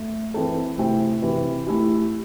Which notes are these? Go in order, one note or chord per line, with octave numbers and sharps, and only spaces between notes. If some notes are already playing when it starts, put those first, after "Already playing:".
Already playing: A3
E3 C4 A4
C3 A3 C4 E4
C3 E3 C4
A3 E4 G4